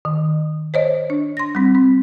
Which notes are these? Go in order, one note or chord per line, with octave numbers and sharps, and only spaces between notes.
D#3
C5 C#5 D#5
D4
C6 A#6
G3 C4
C4